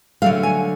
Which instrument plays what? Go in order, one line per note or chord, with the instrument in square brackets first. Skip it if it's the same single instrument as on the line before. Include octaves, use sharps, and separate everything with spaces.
[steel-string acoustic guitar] D3 F#3 A3 F5
G#5